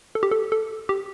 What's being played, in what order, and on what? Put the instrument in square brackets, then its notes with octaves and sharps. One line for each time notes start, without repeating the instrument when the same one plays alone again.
[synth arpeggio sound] A4
G4
A4
A4
G4